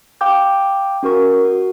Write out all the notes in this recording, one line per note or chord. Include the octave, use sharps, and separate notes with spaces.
F5 G5 D6 G6
C#4 F#4 A#4 C#6
F#4